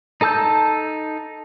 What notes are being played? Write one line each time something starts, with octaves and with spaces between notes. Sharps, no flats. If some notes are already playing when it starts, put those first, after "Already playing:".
D#4 A4 A5 E6 G6